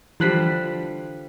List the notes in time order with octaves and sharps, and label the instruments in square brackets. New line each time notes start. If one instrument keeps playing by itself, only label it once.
[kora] D3 F3 G3 [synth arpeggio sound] E3 F#6 B6